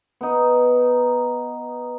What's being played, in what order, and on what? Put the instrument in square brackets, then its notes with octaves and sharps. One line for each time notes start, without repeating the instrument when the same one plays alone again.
[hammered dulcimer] B3 D#4